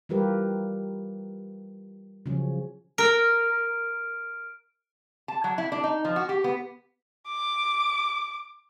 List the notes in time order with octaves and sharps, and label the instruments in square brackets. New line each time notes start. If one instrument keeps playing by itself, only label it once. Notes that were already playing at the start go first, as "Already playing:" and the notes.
[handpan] E3 G3 F4 G4 A#4 B4
C#3 F3 F#3 C#4
[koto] A#4 [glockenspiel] F6 D7
[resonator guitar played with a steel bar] A5
F#3
E4
D4
D#4
F3
F#4
G4
B3
[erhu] D6